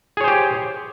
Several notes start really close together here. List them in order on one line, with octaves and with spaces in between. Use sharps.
G#4 C#5 C5 G4